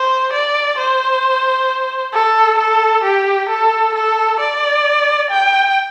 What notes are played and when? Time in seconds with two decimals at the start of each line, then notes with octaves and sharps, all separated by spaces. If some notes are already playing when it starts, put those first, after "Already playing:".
Already playing: C5
0.33 D5
0.78 C5
2.13 A4
2.58 A4
3.04 G4
3.49 A4
3.94 A4
4.39 D5
5.30 G5